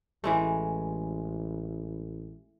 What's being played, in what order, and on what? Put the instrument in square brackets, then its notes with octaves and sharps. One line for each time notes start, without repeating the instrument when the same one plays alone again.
[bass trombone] A1 [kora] E3 G#3 A3